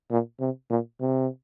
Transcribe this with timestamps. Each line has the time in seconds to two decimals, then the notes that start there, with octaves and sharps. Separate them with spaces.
0.11 A#2
0.40 C3
0.70 A#2
1.01 C3